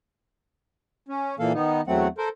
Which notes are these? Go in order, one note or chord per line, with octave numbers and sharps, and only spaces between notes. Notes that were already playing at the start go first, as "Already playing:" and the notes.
C#4
A#2 E3 A#3 A4 F5
D#3 B3 D#4
E2 F#3 A3 C4 F#5
A4 A#4 C5